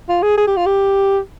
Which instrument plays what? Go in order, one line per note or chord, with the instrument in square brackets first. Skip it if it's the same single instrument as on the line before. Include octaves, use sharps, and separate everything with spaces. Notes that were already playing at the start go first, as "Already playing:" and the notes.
[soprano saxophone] F4
G#4
G#4
G4
F4
G4